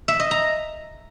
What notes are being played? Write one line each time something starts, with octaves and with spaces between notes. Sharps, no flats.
E5
D#5
A#5